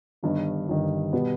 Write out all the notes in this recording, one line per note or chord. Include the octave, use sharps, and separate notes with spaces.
G1 G2 D#3
G1 G2 D#3
B2 G3 B3